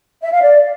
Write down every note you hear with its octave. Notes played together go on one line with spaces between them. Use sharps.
E5
F5
D5